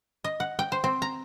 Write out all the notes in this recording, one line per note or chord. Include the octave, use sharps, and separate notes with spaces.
D#5
F#5
G5
C5
C4
A#5